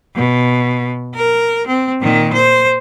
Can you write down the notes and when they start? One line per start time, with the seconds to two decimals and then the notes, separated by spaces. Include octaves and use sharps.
0.16 B2
1.15 A#4
1.67 C4
2.01 A#2 D#3
2.33 C5